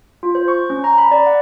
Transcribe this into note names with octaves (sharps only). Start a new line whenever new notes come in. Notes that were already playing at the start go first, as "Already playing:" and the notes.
F4
C5
C#6
C#4
A#5
B5
D5
F#5